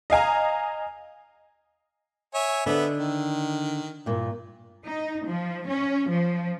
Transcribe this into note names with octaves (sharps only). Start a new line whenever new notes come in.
D#5 F5 G#5 A#5
C#5 E5 G#5
D3 B3 D4 D#5 E5
D#3
G2 A#2
D#4
F3
C#4
F3